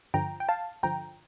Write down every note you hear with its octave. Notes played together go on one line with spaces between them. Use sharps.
G2 D3 F3 G5 A#5
G5
F5 A5
G2 D3 F3 G5 A#5